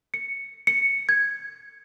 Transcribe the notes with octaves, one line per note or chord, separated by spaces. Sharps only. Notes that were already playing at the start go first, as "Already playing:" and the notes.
C#7
C#7
G#6